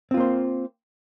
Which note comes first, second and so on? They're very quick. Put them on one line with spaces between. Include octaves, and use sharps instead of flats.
C4 F4 A#3 C5